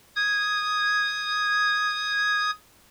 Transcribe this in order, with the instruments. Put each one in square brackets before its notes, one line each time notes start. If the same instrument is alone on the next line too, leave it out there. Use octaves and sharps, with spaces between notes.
[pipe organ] D#6 G#6